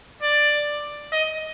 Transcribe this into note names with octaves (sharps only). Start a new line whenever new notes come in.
D5
D#5